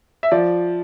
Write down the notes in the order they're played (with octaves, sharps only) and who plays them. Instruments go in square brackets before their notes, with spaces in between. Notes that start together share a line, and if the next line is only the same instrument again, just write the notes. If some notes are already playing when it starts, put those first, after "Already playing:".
[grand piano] E5
F3 D5